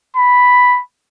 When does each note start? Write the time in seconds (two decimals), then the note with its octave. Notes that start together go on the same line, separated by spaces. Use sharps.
0.17 B5